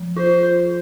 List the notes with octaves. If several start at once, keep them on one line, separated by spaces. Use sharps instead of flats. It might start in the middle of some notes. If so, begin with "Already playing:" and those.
Already playing: F3
F4 C5